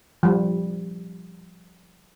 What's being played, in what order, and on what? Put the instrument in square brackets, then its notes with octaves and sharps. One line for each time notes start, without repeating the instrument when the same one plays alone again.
[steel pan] F3 G3